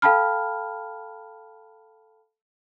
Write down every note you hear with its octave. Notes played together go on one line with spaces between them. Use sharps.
A4 F5 G5 A5 B5 F6